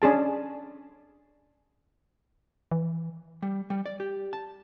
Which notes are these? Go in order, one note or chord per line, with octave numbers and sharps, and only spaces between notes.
C#4 D4 G#4 A5
E3
G3
G3
D5
G4
A5